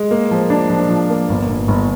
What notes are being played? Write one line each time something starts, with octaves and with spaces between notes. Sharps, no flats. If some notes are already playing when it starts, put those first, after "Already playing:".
Already playing: G#3
A#3
F3
D4
F3
F3
A#3
G1
G1
G1